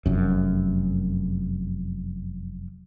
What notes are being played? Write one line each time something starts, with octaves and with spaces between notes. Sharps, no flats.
F1 F#2